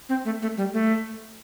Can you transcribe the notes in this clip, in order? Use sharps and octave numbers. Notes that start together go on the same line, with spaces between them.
C4
A3
A3
G3
A3